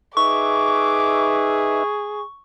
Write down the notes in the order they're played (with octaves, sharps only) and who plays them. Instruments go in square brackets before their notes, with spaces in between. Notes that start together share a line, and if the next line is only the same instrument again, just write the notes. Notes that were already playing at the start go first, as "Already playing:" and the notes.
[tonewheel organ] D#4 B4 E5 [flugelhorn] G#4 [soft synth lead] C#6 [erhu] D6